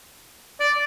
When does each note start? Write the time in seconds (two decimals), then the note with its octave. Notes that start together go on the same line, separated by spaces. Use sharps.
0.60 D5